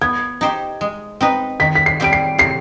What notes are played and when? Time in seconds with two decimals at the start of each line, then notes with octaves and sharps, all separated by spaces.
0.01 B3 G#6
0.41 D#4 G4 C5
0.81 G#3
1.21 C4 D#4 B4
1.60 D#3 B6
1.75 B6
1.86 C7
2.00 G3 C4 G4 D7
2.13 C7
2.38 C3 C7